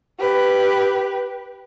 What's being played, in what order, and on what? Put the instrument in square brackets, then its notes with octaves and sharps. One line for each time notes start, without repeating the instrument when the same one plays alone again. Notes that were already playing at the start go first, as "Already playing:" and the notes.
[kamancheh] G4 B4